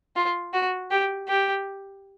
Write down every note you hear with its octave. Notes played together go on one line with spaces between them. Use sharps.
F4
F#4
G4
G4